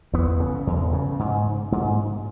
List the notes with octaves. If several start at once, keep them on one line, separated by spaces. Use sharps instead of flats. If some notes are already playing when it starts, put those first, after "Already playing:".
E2 B3
C#3
E2
C#3
G#2
G#2